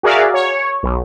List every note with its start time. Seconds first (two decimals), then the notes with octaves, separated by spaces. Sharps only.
0.03 F#4 G#4 A#4 D5 E5 F5
0.34 C#5
0.83 B1